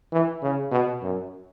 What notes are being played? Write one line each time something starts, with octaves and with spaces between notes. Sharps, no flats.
E3
C#3
B2
F#2